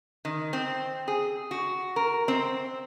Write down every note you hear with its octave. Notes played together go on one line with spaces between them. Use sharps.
D#3
C4
G#4
F#4
A#4
C4